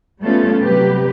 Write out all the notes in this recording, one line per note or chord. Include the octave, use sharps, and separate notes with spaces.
G3 A3 B3 C#4 F4 A4
C3 F#3 G3 G4 B4